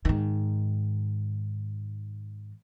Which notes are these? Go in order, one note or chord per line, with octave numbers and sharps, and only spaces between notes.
G#2 D#3